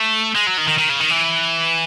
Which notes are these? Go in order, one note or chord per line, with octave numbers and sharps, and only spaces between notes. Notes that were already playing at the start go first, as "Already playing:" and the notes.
Already playing: A3
G#3
F#3
D#3
D#3
D#3
C#3
D#3
E3